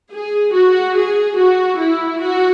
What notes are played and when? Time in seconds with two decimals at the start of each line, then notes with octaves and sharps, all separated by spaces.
0.11 G#4
0.53 F#4
0.95 G#4
1.37 F#4
1.79 E4
2.21 F#4